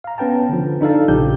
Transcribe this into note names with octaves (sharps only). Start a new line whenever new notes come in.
F5 A#5
B3 C#4 B4 G5 A5
D3 F3
D4 D#4 A4 F5 A5
A#1 C#3 F3 G4 G6